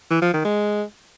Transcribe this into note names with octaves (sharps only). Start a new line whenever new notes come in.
E3
F3
D#3
G#3